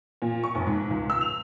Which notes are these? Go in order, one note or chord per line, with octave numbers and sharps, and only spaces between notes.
A#2
C#6
F1
G#2
C#2
E6
F7